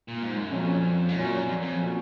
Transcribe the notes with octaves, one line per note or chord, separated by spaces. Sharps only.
A#2
G#2
F#2
F2 A#2 F#3 C#4
G#2
F#2 A#2 F#3 C#4
F2
F2
A#2 F#3 C#4